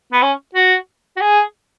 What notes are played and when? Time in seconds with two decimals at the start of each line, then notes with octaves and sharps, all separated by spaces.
0.12 B3
0.22 C#4
0.55 F#4
1.17 F#4
1.21 G#4